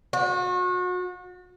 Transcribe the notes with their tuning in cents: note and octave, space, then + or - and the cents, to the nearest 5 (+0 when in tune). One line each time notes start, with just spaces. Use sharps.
F#4 -35